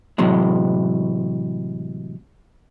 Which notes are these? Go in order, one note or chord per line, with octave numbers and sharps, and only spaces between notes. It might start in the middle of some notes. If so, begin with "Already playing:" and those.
A2 C3 E3 F#3 G#3